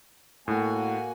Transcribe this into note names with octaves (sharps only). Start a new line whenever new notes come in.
A2 A#3 F#4 G#5